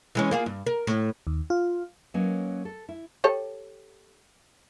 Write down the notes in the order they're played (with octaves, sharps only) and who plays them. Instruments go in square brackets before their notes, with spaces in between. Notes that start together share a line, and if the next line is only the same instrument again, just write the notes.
[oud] E3 G#3 C#4
A#3 F4 G#4
G2
A#4
A2
[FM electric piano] D#2
F4
[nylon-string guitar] F#3 A#3 C#4 B4 D#5
A4
E4
[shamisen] G4 A4 C#5